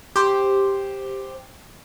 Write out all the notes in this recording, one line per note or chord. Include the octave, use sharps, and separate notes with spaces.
G4 C5